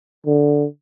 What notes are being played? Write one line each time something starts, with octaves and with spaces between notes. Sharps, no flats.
D3